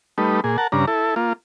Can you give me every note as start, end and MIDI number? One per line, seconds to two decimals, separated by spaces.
0.18 0.41 55
0.18 0.41 57
0.18 0.41 63
0.18 0.41 71
0.44 0.57 46
0.44 0.57 68
0.58 0.67 70
0.58 0.67 78
0.58 0.67 81
0.72 0.86 43
0.72 0.86 49
0.72 0.86 62
0.72 0.86 82
0.88 1.15 64
0.88 1.15 69
1.16 1.33 58
1.16 1.33 65